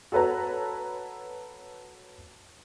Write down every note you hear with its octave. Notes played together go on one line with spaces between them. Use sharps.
F#4 A4 B4 C#5 A#5